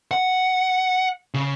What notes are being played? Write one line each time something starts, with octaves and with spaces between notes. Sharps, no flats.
F#5
C#3